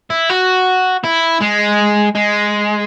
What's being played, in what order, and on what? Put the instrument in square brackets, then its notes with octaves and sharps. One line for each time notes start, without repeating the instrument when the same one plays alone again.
[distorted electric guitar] E4
F#4
E4
G#3
G#3